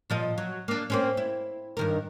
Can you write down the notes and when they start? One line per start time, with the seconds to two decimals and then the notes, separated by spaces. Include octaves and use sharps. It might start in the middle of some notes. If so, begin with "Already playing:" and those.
0.10 A#2 F3 D#5
0.38 F#3
0.68 A#3 D4
0.90 A#3 C4 C#4
1.17 E4
1.77 G2 D#3 A#4